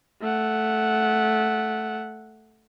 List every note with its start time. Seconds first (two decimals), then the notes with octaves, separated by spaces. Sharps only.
0.22 A3 F#5